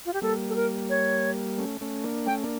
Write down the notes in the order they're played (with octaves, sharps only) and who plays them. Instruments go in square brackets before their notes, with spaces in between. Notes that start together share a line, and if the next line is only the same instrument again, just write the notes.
[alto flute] F4
G4
[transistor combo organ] G3 A#3 [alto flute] A4
[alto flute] A4
A#4
C#5
[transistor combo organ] A3 C#4
A3 C#4
A#3 D4
[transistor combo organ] A3 C#4 [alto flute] G5
[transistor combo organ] A#3 D4